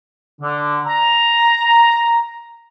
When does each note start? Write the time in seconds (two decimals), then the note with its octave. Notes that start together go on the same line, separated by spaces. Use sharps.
0.41 D3
0.86 A#5